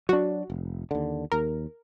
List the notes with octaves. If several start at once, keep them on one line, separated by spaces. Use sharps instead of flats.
F#3 D4 F#4
F1
D#2 D3
D#2 A#4